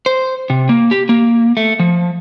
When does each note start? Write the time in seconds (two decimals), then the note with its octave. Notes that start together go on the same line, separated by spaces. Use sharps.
0.06 C5
0.50 C3
0.69 A#3
0.91 G4
1.09 A#3
1.57 A3
1.79 F3